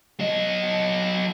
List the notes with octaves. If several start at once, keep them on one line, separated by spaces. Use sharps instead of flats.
F#3 D#5